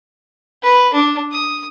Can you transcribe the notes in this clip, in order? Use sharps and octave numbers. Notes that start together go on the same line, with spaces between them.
B4
D4
D#6